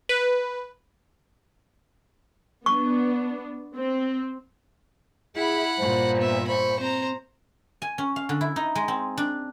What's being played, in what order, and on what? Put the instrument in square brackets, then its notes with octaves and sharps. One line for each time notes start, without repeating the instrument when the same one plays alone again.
[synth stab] B4
[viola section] B3 D4 [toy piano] C#6
[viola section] C4
[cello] E4 [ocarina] G#4 [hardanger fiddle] F#5 B5
[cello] G2 A#2 [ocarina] C5
[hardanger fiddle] B3 E5
[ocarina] C5 [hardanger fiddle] B5 C#6
[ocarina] C4 [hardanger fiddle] C5 A#5
[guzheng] G#5
C#4
F5
D3
E4
D#4
G#3
C4
D4